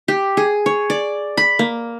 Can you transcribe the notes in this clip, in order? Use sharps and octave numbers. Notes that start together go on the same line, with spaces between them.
G4
G#4
C#5
D5
B5
A#3